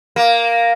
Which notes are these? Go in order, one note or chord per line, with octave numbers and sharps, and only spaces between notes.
A#3